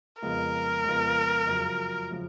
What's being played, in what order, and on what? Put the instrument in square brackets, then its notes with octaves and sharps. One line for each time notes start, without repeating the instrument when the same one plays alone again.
[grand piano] F2 C#3 G#3 B3 F4 [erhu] A#4
[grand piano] F2 C#3 G#3 B3 F4
F#2 C#3 F3
C#3 F3